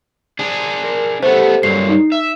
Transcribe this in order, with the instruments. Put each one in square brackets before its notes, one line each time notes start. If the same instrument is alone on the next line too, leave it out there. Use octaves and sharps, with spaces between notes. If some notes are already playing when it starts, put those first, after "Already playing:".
[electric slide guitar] D4 G#4
[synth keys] A#4
[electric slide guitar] A3 B3 [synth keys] G4 A4 [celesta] C5
[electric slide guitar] G2 A#2 F#3 [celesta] C7
[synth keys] D#4
[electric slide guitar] E5